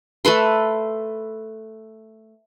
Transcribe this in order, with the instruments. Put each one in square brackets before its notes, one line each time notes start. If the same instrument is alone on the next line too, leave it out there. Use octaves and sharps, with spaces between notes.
[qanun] A3 A4 B4 C6